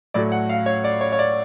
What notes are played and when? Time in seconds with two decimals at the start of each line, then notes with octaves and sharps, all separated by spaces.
0.14 A2 F#3 A3 D5
0.32 F#5
0.49 F5
0.66 C#5
0.84 D5
1.01 C#5
1.13 C#5
1.19 D5